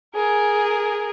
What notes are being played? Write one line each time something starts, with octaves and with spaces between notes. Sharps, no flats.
G#4 A#4